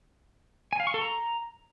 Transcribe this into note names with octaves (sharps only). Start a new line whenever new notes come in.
G#5
F5
C#6
A4
A#5